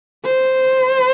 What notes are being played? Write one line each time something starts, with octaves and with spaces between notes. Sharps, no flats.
C5